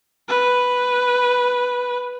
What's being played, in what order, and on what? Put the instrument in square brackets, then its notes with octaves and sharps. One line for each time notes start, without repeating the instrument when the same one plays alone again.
[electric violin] B4